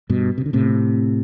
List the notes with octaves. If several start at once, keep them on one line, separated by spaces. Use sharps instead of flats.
G2 B2
C3
D3
A2 C3